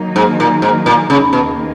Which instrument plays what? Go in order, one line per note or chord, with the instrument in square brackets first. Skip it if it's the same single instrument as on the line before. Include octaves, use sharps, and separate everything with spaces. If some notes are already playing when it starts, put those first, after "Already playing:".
Already playing: [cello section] D#3 F#3 A#3 D#4
[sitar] G#2
A#2
G#2
A#2
C#3
[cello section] D#2 D#3 A#3 D#4 [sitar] B2